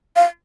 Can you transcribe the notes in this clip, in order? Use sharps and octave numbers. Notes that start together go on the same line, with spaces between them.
F5